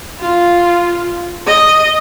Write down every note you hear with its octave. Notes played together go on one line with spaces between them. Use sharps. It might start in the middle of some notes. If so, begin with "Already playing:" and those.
F4
D#5